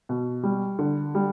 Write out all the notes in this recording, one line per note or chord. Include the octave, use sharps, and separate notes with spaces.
B2
G3
D3
G3